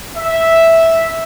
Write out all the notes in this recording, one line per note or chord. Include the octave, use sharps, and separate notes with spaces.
E5